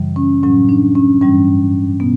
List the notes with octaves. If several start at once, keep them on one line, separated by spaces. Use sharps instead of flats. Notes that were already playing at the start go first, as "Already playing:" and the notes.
Already playing: F#2 C#3 E3 G3
C#4
A2 F#3 C#4
D4
C#4
G2 E3 G3 C#4
B2 B3